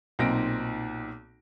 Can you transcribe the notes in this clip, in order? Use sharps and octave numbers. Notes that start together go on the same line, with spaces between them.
B1 A#2 C4 D#4 A#6 D7